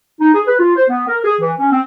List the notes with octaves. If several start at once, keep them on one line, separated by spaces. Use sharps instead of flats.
D#4
G#4
B4
F4
C5
B3
A#4
G#4
E3
C#4
C4